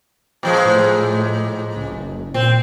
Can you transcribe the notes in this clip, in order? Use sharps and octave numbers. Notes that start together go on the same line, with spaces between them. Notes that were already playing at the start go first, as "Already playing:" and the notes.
A#2 F3 G#3
A2
C#2
F#1
A#2 C4